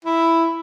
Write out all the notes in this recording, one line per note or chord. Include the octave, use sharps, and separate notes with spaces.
E4